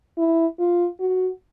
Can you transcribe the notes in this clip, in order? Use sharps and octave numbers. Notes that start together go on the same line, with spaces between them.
E4
F4
F#4